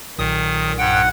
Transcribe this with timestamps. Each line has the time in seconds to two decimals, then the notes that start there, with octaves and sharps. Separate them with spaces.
0.19 B1 A#2 D#3 D#6
0.79 G2 F#5 G5